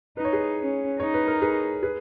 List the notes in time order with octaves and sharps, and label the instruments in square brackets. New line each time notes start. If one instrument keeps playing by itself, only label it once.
[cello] D#4 [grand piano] B4
[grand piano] C#5
G#4 B4
[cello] C#4
[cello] D#4 [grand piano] C#5
[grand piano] B4
A#4
G#4 B4
G#4 B4